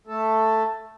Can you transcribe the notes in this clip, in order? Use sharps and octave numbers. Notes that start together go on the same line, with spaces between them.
A3 A4